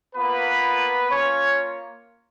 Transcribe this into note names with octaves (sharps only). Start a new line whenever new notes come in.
A#3 B3 F4 B4
A#3 C#4 F4 C#5